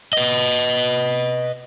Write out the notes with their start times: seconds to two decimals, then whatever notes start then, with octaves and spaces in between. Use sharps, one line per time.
0.13 B4 D#5